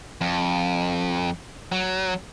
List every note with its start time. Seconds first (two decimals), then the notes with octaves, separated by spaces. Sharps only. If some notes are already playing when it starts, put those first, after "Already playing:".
0.21 F2
1.72 F#3